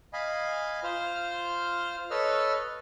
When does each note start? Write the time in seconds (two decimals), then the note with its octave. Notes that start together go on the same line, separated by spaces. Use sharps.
0.13 D#5 F5 G#5 B5
0.84 F4 C5 F6
2.11 A4 B4 C#5 D#5 E6 F6